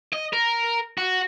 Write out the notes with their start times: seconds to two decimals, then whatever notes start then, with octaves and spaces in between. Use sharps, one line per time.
0.13 D#5
0.33 A#4
0.98 F#4